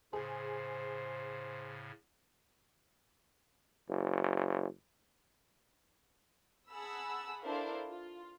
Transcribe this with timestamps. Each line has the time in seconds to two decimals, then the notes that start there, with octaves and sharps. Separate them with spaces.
0.13 A2 C#3 G#4 C5
3.88 F#1
6.70 G#4 F#5 A5 B5 E6
7.43 D4 E4 A4 A#4 C5 F5
7.88 F4